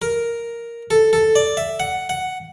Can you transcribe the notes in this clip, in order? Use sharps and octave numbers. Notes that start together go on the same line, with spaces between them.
A#4
A4
A4
D5
E5
F#5
F#5